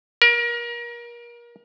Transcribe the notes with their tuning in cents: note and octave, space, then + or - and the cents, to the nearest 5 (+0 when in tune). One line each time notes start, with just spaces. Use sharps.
A#4 +30